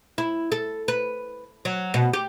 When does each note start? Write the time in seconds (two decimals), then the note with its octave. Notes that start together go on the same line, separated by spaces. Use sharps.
0.18 E4
0.52 A4
0.88 B4
1.65 F#3
1.94 B2
2.13 G4